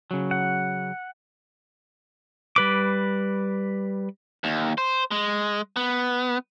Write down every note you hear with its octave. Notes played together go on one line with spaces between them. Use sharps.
C#3 F#3
F#5
G3 B4 D6
D#2
C5
G#3
B3